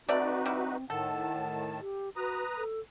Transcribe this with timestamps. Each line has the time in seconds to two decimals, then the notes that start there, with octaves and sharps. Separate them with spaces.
0.09 A3 C4 D#4 F#4 B4 D5
0.46 G3 E4
0.90 A2 D#3 A4 F#5 A5
1.81 G4
2.16 F#4 B4 A#5 D#6
2.57 A4